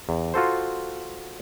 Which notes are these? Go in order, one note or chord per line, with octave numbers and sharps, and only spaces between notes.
E2
F4 F#4 A4 C5